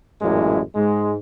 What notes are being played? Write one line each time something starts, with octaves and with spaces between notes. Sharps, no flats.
A1 F#2 A#2 G#3 E4
G#2 G#3